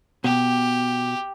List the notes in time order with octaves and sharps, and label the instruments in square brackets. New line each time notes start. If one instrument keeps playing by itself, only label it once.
[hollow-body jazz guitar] B2 [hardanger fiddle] G4